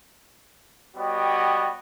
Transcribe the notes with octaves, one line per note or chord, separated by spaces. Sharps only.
G3 B3 F#4 C#5 D#5 G5